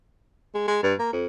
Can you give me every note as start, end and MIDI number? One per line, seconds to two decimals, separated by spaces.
0.54 0.64 56
0.68 0.79 56
0.83 0.94 43
0.99 1.10 58
1.13 1.27 41